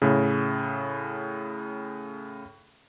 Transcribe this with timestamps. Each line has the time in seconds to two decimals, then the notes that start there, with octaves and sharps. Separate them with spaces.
0.02 A2 C#3